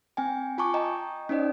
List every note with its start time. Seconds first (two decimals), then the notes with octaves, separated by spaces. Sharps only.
0.17 C4 G5 G#5
0.58 F4 G#5 A5 C#6 D6
0.74 D#5 G5 A#5
1.29 C#4 D#4 C5 D5 D#5